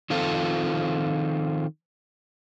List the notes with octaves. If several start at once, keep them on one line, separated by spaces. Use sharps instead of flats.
D#3 F3 C4 F4 A4